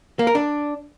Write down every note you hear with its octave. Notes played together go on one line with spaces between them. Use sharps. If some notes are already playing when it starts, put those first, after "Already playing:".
A#3
A#4
D4